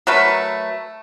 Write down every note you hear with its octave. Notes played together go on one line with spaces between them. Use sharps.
F#3 A3 A#4 B4